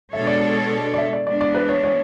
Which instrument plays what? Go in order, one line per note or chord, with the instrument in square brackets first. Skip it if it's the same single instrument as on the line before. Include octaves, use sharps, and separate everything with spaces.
[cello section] B2 G#3 D4 A4 C#5 [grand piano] E5
[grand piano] D5
D5
E5
D5
[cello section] E3 G#3 B3 D4 [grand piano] D5
[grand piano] D5
B4
C#5
C#5